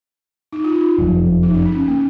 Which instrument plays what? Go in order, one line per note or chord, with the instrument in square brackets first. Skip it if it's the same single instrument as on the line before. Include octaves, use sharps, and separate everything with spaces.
[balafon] D#4
F4
D#4
[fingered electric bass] F#1 F2 F3
[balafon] D#4
C#4
C#4
A#3